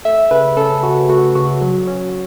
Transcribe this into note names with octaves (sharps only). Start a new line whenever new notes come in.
A3 E5
C#3 B4
C#4 A4
C#3 F#4
A3 F#4
C#3 F#4
F#3
C#4